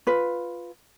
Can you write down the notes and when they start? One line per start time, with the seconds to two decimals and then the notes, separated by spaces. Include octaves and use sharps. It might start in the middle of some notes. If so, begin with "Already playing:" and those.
0.07 F4 B4